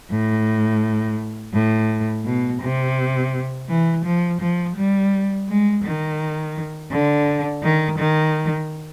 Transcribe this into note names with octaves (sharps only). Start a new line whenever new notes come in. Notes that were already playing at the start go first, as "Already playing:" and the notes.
A2
A2
B2
C3
E3
F3
F3
G3
G#3
D#3
D3
D#3
D#3